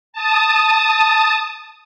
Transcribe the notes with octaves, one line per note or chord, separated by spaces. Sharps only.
A5 D#6